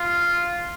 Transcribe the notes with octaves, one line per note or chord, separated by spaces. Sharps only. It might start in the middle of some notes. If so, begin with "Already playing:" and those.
Already playing: F4